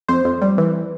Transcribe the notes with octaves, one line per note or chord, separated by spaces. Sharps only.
F2 C5
F2
G3
E3